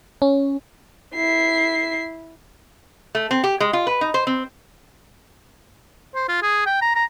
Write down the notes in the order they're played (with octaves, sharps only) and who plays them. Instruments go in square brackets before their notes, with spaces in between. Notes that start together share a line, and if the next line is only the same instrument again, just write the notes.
[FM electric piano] C#4
[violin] E4 C7
[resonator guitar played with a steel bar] A3
C4
G4
G#3
F4
B4
D#4
C5
C4
[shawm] C5
F4
G#4
G5
A#5
A#5